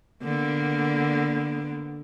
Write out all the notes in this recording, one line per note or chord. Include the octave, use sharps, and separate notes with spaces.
D3 A#3 B3